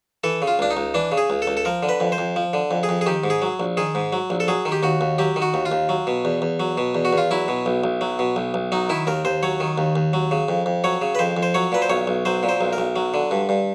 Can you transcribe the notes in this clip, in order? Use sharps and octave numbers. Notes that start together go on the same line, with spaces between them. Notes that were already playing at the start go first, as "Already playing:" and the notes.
E3 A4
C#3
F4
C#2 D4
D#4
C#2
E3 D4
C#3
G#4
C#2
A4
C#2
A4
F3 A#4
D3
B4
F2
C5
F2
F3
D3
F2
G#4
F2
G#4
D#3 G4
G#2
G#4
F#3
A#1
D#3 G#4
G#2
F#3
A#1
A4
F#3 G#4
D#3
G4
D#2 F#4
D#2
F#3 G4
D#3
F#4
D#2
F4
D#2
F#3
B2
E2
E2
F#3
B2
E2
F#4
E2 F4
F#3 E4
B2
B1
B1
F#3
B2
B1
B1
F#3 D#4
D#3 E4
D#2 A#4
D#2 C5
F#3 C#5
D#3
D#2
D#2
F#3
C#3
F2
F2
F#3 C#5
C#3
B4
F2 C5
F2
C5
F#3 C#5
A#2 B4
C5
B1 C#5
B1
F#3 C5
A#2
C5
B1
A#4
B1
F#3
D3
G2
G2